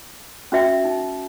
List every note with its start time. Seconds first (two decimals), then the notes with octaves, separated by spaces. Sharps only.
0.52 C#4 F#4 E5 G5
0.85 D#4